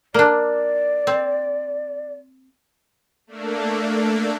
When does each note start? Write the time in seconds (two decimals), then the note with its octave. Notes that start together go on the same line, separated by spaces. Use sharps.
0.14 A#3 D4 D5
1.07 C4
3.27 A3 A#3 D4